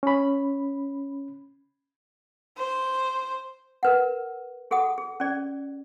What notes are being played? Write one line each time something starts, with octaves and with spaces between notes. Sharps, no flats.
C#4 B5
C5
A#4 B4 F#5
F#4 G#4 A4 F#5 D#6
G#4
C#4 G#4 D5